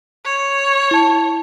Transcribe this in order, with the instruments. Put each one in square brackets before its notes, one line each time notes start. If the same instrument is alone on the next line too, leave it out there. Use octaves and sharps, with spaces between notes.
[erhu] C#5
[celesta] E4 A5